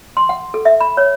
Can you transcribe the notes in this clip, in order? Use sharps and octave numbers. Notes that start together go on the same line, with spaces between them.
C6
F#5
A4
E5
B5
C#5